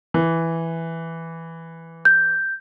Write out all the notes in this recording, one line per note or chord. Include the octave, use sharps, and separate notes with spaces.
E3
G6